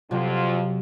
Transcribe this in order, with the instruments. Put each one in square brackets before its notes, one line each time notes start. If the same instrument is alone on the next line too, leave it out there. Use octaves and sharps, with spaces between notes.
[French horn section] F2 F4 [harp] C3 F#3 C4